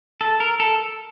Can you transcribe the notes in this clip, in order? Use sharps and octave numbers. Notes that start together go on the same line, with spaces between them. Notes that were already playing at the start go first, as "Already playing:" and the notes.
A4
A#4
A4